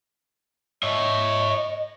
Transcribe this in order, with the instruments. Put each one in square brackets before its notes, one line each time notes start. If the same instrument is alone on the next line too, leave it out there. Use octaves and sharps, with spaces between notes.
[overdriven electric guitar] C#5 E5 [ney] D#5